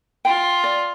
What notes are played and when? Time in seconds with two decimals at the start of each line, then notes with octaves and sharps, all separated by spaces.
0.25 F4 G5
0.64 D5